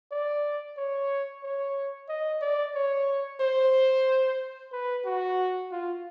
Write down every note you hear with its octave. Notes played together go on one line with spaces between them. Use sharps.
D5
C#5
C#5
D#5
D5
C#5
C5
B4
F#4
F4